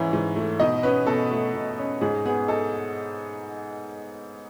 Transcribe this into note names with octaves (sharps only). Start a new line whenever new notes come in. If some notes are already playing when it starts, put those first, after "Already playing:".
Already playing: G#2 E3 C#4 E4
G#2
A3
B2 D#4 D#5
B3 C#4 B4
B2 A4
A3
B2
C#4
G#2 G#4
B3 G#4
D#4 A4